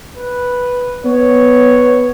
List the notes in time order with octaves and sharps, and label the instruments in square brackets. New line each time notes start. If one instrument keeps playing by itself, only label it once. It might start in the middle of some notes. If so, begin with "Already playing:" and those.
[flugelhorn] B4
[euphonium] B3 [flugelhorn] C#5